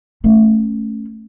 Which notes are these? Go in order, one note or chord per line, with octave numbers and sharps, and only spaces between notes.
A3 C#4